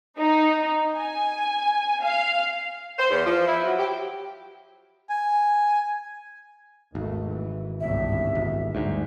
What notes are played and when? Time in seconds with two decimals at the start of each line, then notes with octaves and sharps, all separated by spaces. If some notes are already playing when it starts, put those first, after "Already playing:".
0.18 D#4
0.95 G#5
2.04 F5
2.99 C5
3.11 E2
3.26 F3
3.47 E4
3.65 F#3
3.78 G4
5.10 G#5
6.95 G#1 D#2 A3
7.27 E3
7.80 G1 C2 A2 E5
8.35 G#1
8.75 G1 D2 G#2